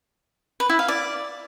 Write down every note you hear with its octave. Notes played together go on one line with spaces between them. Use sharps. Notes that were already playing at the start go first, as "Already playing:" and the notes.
B4
E4
F5
D5